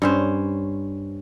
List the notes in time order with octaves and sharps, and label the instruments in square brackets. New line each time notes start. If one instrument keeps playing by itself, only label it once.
[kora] G2 C#4 C5